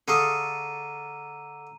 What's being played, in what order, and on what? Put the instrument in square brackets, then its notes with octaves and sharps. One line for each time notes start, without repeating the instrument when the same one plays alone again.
[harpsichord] D3 F5 C#6 [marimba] G#4 [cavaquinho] A4 D#6 [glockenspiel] A#5 D#7